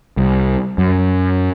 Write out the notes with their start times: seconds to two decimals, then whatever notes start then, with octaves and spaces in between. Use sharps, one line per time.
0.17 C2
0.78 F#2